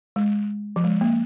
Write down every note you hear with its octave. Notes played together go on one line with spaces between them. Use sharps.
G#3
F3
G#3
A#3